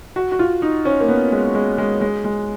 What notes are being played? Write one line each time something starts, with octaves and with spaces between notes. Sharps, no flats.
F#4
F#4
F4
D#4
C#4
A#3
B3
G#3
G#3
G#3
G#3
G#3